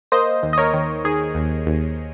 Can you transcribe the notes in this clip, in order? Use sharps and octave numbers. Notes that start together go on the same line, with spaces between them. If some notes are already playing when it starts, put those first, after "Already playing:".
A#3 C5 D#5
D#2
D#5
A#4 C#5
D#3
D#3 G#4
D#2
D#2